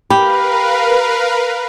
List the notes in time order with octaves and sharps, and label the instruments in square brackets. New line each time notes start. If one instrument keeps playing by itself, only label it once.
[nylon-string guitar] G4 [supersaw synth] A#4 B4 F5 [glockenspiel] B5